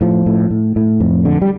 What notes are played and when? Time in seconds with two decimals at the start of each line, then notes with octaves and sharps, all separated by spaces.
0.01 A2 F3
0.26 A2
0.51 A2
0.76 A2
1.00 F2
1.25 D3
1.42 G3